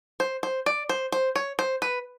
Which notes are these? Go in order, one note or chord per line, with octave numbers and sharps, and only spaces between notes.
C5
C5
D5
C5
C5
C#5
C5
B4